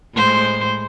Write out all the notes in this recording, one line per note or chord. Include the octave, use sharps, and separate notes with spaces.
A2 G#3 C5